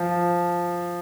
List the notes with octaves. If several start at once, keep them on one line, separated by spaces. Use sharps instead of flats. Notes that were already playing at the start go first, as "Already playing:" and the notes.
Already playing: F3